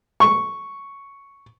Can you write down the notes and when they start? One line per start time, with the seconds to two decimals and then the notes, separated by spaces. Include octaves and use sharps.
0.20 C#6